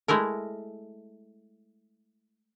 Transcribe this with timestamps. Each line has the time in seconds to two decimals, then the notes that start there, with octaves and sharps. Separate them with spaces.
0.08 G#3 A3 E4 A#4